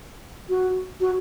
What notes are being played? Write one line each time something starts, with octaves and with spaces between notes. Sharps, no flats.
F#4
F#4